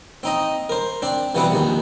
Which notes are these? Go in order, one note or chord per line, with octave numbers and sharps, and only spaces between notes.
C4 D#4 D#5
A#4 C5
C4 D4
B2 E3 G3 B3 C4 F#5
A#1 D#2 D#3